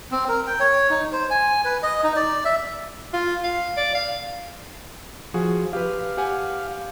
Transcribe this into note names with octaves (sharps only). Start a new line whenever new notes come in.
C4
A#4
G5
C#5
D#4
C5
G#5
B4
D#5
D#4
D5
E5
F4
F5
D5
F5
F3 F#4 G#4
G4 B4 F5
G4 F#5 G#5